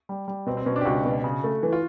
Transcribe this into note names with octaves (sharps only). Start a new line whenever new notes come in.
G3
G3
B2 C4
C4
B2 C#4
D4
G4
C#2 F#4
B2
C#3
A3
E3
F4